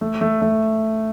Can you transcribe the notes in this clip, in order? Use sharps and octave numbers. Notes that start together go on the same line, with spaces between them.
A3
A3
A3